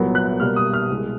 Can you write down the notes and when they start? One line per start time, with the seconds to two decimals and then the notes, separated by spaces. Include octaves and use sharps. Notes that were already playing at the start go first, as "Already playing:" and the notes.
Already playing: C2 A#2 F#3 B3
0.15 F#6
0.40 B2 G3 A#3 F6
0.56 D#6
0.74 F6
0.91 C2 B2 G#3